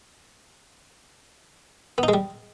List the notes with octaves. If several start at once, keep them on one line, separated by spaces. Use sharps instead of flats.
B3
D#4
G#3
G3